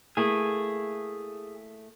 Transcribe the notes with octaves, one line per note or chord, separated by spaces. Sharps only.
A3 A#3 E4 G#4